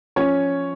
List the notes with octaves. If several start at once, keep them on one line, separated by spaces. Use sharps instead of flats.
F3 C#4 C#5